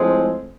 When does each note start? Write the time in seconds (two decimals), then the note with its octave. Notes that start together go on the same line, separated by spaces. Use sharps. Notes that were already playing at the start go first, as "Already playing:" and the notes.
Already playing: A2 F3 G#3 C4